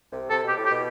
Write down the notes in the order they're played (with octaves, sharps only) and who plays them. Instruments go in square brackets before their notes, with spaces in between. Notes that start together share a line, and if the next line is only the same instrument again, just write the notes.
[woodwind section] C2 C3
[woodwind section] C3 [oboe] A4
[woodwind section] B2
[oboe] G4
[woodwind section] A2
[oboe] G4
[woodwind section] B2